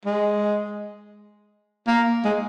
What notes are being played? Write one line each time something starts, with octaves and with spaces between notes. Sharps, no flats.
G#3
A#3
G#3